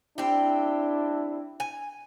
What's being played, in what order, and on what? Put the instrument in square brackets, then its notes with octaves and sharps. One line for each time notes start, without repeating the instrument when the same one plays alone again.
[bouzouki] C4 G4 [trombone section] D4 E4
[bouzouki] G#5